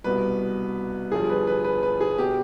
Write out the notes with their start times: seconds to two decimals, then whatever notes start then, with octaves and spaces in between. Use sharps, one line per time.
0.04 C2 B2 B4
1.12 G1 G2 F3 G#4
1.30 B4
1.47 B4
1.65 B4
1.83 B4
2.01 G#4
2.18 B2 G4